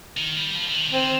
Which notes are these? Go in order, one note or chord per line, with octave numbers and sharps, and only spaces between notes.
D#3
G3
F3
D3
D#3
D3
D#3 C4